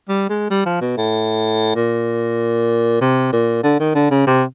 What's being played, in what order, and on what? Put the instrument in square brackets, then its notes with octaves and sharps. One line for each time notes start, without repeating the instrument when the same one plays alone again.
[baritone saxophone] G3
G#3
G3
F3
B2
A2
A#2
C3
A#2
D3
D#3
D3
C#3
C3